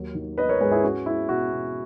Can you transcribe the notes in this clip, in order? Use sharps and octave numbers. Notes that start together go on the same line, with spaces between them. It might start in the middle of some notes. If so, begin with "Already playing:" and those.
Already playing: D#2 F#3
D#3
B3 B4 D#5
A#4 C#5
G#2 G#4 B4
E4 G#4
C#4 F#4
G#3 E4
B2 F#4
B2